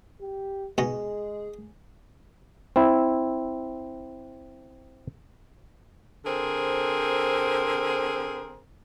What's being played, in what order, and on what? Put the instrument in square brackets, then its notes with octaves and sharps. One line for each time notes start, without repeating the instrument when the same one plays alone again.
[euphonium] G4
[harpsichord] B2 D#4 [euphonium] G#3 [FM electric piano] G#4
[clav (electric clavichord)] C4 E4
[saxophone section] D3 C4 G#4 A#4 C5